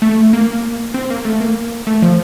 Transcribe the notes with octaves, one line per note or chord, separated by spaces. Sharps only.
A3
A#3
C4
A#3
A3
A#3
A3
F3